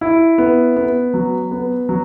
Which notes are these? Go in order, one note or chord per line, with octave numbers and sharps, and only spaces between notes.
E4
B3
B3
F#3
B3
F#3